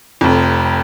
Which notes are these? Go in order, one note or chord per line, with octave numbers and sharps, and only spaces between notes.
F1 F2